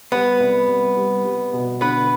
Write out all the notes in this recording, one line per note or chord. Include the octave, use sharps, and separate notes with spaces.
G3 B3 B4
C2
C2
G3
G3
B2
D3 B3 B4